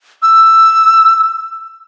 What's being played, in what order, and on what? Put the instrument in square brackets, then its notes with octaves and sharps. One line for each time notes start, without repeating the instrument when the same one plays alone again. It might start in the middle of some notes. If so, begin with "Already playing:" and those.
[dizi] E6